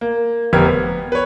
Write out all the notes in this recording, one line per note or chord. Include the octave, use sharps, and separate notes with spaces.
A#3
F1 B3 G4 A#4 F6 G#6
B3
B4 C#5